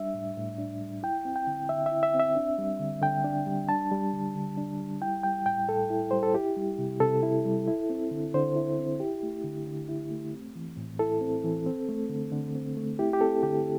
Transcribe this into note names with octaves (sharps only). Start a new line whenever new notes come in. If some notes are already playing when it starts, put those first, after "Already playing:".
Already playing: G3 D4 E5
A2
A2
D4
G3
E4 G5
C4
G5
D3
D3 E5
E5
E4
E5
C4
E5
D4
G3
D3
D3 G5
D4
G3
D4 A5
G3
D3
D3
D4
G3
E4 G5
G3 G5
A2 G5
A2 A4
E4
G3 C5
A4
E4 G4
G3
C3
C3 A4
E4
G3
E4
C4
D3
D3 C5
E4
C4
E4 G4
A3
D3
D3
E4
A3
C4
E3
A2
E4 A4
C4
E3
C4
A3
D3
D3
C4
A3
E4 G4
G4
C4 A4
D3 G4